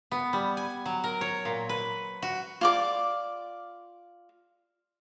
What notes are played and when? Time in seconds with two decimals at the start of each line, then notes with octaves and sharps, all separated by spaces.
0.11 B3
0.33 G3
0.57 G#5
0.86 F#3
1.04 A#4
1.21 C#5
1.45 A#2
1.69 B4
2.22 F#4
2.61 F4 D5 D6